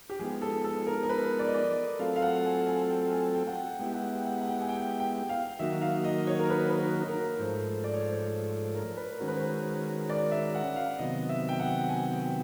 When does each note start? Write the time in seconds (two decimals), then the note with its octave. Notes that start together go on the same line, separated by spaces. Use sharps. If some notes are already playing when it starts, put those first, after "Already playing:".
0.10 G4
0.19 F3 G#3 B3 D#4 G#4
0.42 A4
0.64 A4
0.87 A#4
1.03 A#4
1.09 B4
1.39 D5
1.47 D#5
1.54 D5
1.99 F#3 A3 C4 F4 A4 F5
2.16 F5
2.22 F#5
2.44 G#5
2.67 G#5
2.89 G5
3.12 G#5
3.34 G5
3.47 F#5
3.57 G5
3.79 G#3 B3 E4 G4 G5
3.94 F#5
4.02 G5
4.25 F#5
4.41 F#5
4.47 G5
4.61 G#5
4.69 G5
5.00 G5
5.29 F5
5.59 D#3 F#3 A#3 D#4 F#4 E5
5.81 F5
6.04 D#5
6.27 C#5
6.39 A#4
6.50 B4
6.69 B4
6.79 A#4
7.09 A#4
7.39 G#2 F3 A3 C5
7.84 D5
7.94 C#5
8.02 C5
8.12 C#5
8.74 A#4
8.97 B4
9.19 D#3 G#3 C#4 F#4 A#4 C5
9.28 B4
9.36 C5
10.10 D5
10.31 E5
10.54 F#5
10.76 F5
10.99 C3 D#3 F#3 B3 D#5
11.29 E5
11.49 G5
11.60 F#5
11.89 G#5
12.11 G5